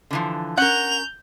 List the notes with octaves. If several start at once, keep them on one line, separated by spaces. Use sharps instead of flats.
D3 E3 F3
C#4 A#4 F#5 G6 F7